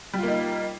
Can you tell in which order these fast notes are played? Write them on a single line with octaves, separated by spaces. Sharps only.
G3 F4 A#3 D#4